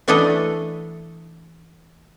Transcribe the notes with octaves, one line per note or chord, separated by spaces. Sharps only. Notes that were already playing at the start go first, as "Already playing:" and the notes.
E3 A3 D4 E4 A4 D#5